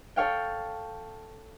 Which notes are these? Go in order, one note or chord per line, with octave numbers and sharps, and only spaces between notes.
A4 C#5 F5 G5